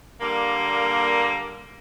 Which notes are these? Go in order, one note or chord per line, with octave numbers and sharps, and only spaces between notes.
D3 G3 A#3